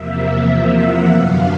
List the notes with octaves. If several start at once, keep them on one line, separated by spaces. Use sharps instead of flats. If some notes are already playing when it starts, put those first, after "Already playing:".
Already playing: E2 C3 F3 A#3 E5
E5
F#5
F#2 D3 F#3 B3 F5